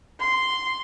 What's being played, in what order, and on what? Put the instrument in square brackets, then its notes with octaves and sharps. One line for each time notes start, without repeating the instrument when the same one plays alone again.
[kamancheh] C6